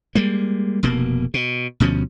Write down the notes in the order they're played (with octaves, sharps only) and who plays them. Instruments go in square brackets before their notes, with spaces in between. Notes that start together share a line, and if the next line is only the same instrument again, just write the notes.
[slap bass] G3 G#3 A#3
F1 B2 A#3
B2
D2 B2 F3 C#4